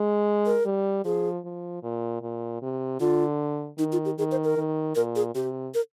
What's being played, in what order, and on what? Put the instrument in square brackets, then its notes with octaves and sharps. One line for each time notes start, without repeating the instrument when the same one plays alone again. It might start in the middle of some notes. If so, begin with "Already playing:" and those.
Already playing: [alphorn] G#3
[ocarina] A#4
[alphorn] G3
[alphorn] F3 [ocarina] G#4
[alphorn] F3
A#2
A#2
C3
[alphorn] D3 [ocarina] F4
[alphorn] D#3 [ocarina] D#4
[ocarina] F4
G4
[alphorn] D#3 [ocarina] G#4
[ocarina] C5
A#4
[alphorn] D#3
[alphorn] A#2 [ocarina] A#4
[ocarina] G#4
[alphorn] C3 [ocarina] G4
[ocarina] A#4